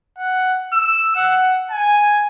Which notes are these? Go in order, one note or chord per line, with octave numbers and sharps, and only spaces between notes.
F#5
E6
F#5
G#5